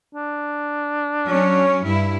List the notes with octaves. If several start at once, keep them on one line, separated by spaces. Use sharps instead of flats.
D4
F#3 C#4 C#5
G2 E4